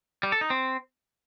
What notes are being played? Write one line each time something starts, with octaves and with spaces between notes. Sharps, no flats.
G3
A4
D#4
C4